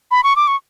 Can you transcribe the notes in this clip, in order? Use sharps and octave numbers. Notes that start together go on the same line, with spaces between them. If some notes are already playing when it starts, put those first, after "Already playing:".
B5
C#6
D6
C#6